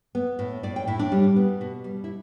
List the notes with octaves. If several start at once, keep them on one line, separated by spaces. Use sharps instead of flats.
B3
A2
A2 D5
G5
A2 E4
D4
G3
B3
B2
G3
E4